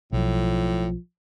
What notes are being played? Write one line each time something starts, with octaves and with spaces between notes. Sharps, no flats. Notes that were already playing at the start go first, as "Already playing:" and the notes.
B1 A2 F3